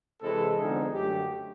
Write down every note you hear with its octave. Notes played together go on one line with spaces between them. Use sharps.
C3 E3 G#3 C4 E4 A4
D3 F3 G#3 B3 D#4 G#4
F#2 D3 F#3 A3 G4